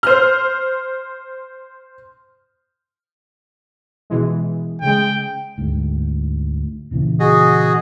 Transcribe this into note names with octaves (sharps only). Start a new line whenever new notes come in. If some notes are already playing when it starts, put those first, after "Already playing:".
C5 F6
B2 E3 G#3
C#3 G#3 G5
D2 G#2
A#2 C#3 E3
F#4 G#4 D#5